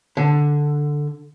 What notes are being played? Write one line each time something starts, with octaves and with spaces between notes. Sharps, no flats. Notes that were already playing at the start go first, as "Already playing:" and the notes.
D3